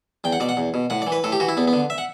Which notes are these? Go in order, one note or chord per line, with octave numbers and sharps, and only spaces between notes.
E2 G5
F#5
B2 D5
F#5
E2
B2
A2 F#5
E3 D5
B4
A2 A4
G4
E3 F#4
E4
E2 B3
B3
D3
E5
F#5